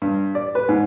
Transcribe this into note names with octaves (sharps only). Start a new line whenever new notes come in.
G2
D5
B4
G#2